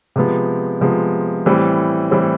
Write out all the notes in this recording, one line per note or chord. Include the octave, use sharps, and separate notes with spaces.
C3 F3 G#3 B3
C3 F3 G#3 B3
A2 E3 G3 C4
A2 E3 G3 C4